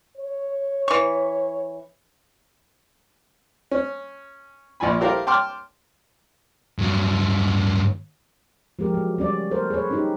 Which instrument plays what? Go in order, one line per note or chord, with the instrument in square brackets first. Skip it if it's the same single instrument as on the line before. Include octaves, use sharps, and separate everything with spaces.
[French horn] C#5
[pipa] E3 C#6
[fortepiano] C#4
A#1 F3 F4 G#5 B5
E4 G4 A4 A#4 C5 F5
G5 A5 C6 D6 F6
[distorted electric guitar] G2 F#3
[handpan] F3 G#3 G4 A#4
F#3
G3 C#4 D5
A4 A#4 C5
G#4 A4 B4 C#5
C#4 D#4 G4